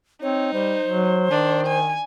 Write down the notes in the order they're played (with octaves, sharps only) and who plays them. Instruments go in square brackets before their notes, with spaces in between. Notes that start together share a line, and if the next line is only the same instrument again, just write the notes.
[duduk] C4 [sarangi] D#4 [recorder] C#5
[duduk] G3 [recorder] C5
[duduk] F#3
[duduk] D#3 [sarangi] D4
[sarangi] G#5